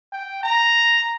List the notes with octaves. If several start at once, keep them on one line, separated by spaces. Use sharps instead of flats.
G5
A#5